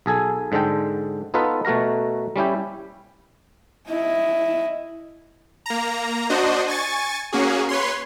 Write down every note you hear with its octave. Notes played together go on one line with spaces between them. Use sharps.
B1 G#4 A4 G#5
G#2 D3 G#3 A4 G5
B3 D#4 F4 A4 B4
B2 A3 F#4 A#4 A#5
G3 C#4 E4 G4
E4 D#5
A#3 A#5
D4 F#4 C5 D#5
G#5 C#6 A6
A#3 C#4 F#4 G#4
B4 C#5 C6